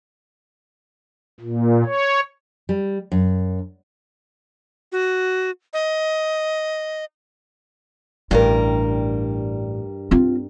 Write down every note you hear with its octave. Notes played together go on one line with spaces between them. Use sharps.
A#2
C#5
G3
F#2
F#4
D#5
A1 G2 G3 A#4
C4 F4